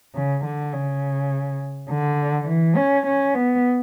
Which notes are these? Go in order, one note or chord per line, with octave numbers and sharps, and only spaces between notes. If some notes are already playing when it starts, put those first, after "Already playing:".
C#3
D3
C#3
D3
E3
C#4
C#4
B3